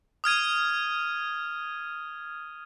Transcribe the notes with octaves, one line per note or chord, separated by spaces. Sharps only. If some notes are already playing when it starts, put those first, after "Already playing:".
D#6 F6 G#6 D#7